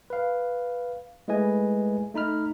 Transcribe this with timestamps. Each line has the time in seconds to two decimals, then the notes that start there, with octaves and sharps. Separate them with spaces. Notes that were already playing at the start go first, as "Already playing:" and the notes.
0.10 B4 F5
1.28 G#3 A3 E4 B4 D#5 G#5
2.14 A3 D#4 B5 F6